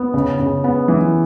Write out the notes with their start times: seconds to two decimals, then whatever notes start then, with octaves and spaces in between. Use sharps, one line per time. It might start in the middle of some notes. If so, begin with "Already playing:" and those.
Already playing: B3
0.14 C#3
0.39 C#3
0.64 B3
0.88 E3